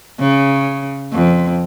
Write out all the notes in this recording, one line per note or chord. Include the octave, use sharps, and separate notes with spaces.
C#3
F2